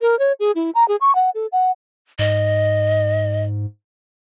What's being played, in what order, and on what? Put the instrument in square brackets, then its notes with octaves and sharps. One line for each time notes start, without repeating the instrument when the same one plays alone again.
[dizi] A#4
C#5
G#4
E4
A#5
G#4
C#6
F#5
A4
F#5
[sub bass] G#2 [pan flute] D#5